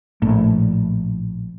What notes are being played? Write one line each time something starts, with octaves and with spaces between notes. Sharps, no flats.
A#1 A2